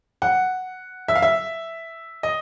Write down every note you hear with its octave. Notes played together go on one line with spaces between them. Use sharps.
F#5
E5
F5
E5
D#5